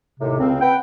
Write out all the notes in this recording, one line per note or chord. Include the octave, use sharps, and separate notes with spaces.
D#2 A2 C3
C#2 C4
B4 F#5 G5